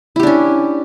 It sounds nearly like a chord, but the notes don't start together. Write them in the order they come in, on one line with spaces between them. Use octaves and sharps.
E4 G4 D4 C#4